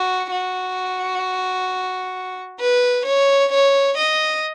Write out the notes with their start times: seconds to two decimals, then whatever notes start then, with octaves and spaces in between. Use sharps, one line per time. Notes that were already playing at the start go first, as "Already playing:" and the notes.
Already playing: F#4
0.31 F#4
2.60 B4
3.06 C#5
3.52 C#5
3.98 D#5